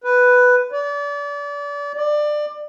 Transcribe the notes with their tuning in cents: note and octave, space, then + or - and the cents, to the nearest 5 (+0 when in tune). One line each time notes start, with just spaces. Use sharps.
B4 +5
D5 -35
D5 +20